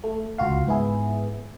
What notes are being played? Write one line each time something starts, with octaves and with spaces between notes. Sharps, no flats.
A3
C#2 F4 F#4 F5
G#2 B3 E4 G#4